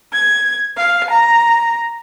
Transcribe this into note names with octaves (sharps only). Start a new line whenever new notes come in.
G#6
F5
A#5